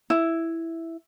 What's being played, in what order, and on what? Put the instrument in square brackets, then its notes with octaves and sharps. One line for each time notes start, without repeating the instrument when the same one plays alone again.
[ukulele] E4